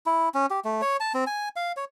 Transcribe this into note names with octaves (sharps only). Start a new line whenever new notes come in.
E4
C#4
G4
A3
C#5
A5
C4
G#5
F5
C#5